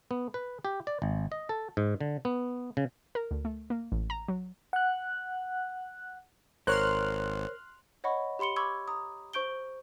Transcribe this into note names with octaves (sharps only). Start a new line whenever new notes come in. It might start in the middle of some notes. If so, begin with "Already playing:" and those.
B3
B4
G4
D5
G#1
D#5
A4
G#2
D3
B3
C#3
A#4
D2
A3
A#3
A1
A#5
F#3
F#5 F#6
G#1 A#4 C5 C#5 C6 F6 F#6
C#5 D#5 F#5 B5 C#6
G4 B5 C6 C#7 G7
B5 C#6 D6 E6 G#6
A#5 D#6
C5 C#6 G6 D7 G7